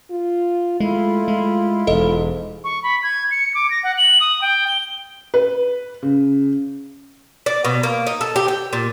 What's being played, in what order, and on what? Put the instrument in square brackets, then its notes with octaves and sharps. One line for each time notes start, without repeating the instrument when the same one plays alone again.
[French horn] F4
[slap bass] G#3 [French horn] A3 [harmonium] E4 F4
[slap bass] G#3
[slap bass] E1 [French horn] G#2 [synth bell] A4 D#5
[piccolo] C#6
B5
G#6
C#7
D6
A#6
F#5
F#7
D#6
G5
G7
[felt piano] B4
C#3
[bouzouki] D5
B2
A#3
D#4
A4
G4
G5
A#2